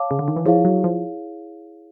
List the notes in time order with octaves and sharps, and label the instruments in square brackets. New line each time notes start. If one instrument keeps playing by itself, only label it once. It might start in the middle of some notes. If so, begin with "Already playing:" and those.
Already playing: [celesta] C#5 F5 A5 D6
[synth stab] C#3
D3
D#3
E3
[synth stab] F3 [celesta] E4 G#4 C#5 F5
[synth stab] F#3
F3